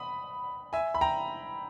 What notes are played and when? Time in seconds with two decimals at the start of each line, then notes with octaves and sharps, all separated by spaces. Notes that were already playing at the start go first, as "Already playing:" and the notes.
Already playing: B5 D#6
0.73 E5 G#5
0.95 B5
1.01 G5 A#5